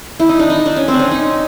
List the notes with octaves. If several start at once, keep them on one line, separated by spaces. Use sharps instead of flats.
E4
D#4
D4
D#4
D4
C#4
C4
D4
C#4
D#4